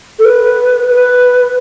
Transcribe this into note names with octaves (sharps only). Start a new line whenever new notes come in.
A4
B4
B4